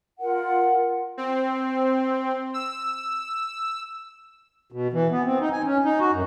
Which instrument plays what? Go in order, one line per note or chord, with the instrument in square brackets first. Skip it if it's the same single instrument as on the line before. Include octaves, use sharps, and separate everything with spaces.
[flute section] F4 A#4 F#5
[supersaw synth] C4
E6
[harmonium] B2
E3
B3
C4
D#4
G#5
C#4
D#4
F#4
F#2